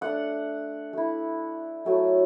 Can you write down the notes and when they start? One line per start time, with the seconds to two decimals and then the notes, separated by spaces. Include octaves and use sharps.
0.01 A3 D4 F#5
0.93 A3 E4
1.85 F#3 A3 E4